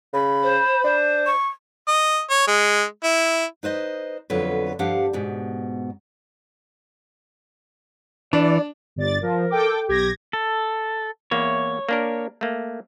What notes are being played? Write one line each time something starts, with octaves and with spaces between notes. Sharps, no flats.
C#3 B5
C5
D4 C5
C#6
D#5
C#5
G#3
E4
D#4 B4 C5 D#5
F2 D3 F#3 B3 F4 B4
G2 F3 D4 G4 F5 F#5
G#2 B2
E3 D4 D5
G1 D5 A6
F3 A#4
A4 G5 D6
B1 G4 G#6 A#6
A4
E2 A#3 E4 C#5
A#3 D4 A#4
A3 A#3